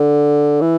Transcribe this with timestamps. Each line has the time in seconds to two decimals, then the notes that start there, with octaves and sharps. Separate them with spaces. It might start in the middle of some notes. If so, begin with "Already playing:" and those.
Already playing: D3
0.62 E3